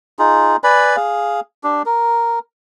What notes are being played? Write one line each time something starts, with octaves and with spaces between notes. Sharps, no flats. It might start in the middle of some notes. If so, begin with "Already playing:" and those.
D#4 F4 G#4
B4 D5 G#5 B5
G#4 F5
D4 G4
A#4